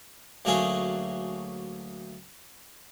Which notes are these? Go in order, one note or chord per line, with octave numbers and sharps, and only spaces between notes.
D2 F#3 A3 A#3 C#4 G#4